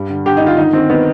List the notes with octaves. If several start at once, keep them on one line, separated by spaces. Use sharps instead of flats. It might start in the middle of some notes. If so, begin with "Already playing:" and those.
Already playing: G2 G3
D3
D3 G4
D#4
D3 F4
D#3 D#4
D#3 C4
D#3 B3